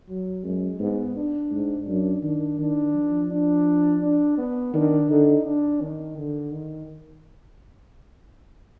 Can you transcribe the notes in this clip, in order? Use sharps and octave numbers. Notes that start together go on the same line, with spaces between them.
F#3
F#2 G#3
G#2 B3
D4
G#2
F#2 D4
D#3 D4
D#3 D4
F3
D4
D4
B3
D#3 D4
D3 D#4
D4
D#3
D3
D#3